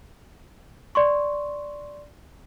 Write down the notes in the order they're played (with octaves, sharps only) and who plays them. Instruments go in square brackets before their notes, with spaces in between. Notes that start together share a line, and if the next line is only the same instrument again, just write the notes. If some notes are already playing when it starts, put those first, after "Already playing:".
[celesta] D5 C6 C#6